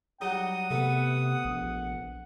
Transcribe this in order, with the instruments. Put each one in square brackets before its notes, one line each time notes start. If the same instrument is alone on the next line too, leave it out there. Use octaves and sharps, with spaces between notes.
[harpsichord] F#3 G3 D#4 [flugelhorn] F#5 [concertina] D#6
[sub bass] C3 [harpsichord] A3 B3
[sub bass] A#1